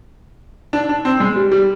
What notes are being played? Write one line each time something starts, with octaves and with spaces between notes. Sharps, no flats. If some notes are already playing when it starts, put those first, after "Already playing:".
D4
D4
C4
G#3
G3
G3